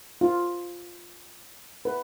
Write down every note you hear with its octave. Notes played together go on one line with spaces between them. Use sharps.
F4
B4